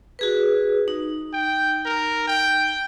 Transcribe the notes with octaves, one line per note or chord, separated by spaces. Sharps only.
F#4 G#4 B4
D#4
G5
A#4
G5